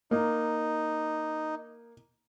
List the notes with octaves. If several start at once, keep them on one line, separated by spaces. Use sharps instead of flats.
A#3 D#4